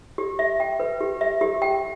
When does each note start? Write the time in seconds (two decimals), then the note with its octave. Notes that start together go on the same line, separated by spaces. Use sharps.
0.18 G4
0.39 E5
0.60 G5
0.80 B4
1.01 G4
1.21 E5
1.41 G4
1.62 G5